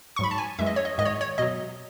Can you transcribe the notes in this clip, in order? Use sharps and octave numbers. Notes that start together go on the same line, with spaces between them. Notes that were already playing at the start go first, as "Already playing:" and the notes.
C#6
G#2 F#3 B5
A5
G#5
F#2 E3 G#3 E5
D#5
C#5
D#5
G#2 D#3 G#3 D#5
C#5
C#5
B2 F#3 D#5